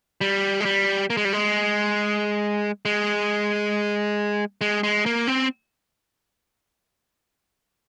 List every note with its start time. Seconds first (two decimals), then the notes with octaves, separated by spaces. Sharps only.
0.21 G3
0.60 G#3
0.65 G3
1.10 A#3
1.17 G#3
1.25 G3
1.33 G#3
2.85 G#3
4.61 G#3
4.83 G#3
5.06 A#3
5.28 C4